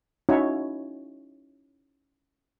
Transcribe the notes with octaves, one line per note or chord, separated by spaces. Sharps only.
C#4 D#4 E4 F#4 C#5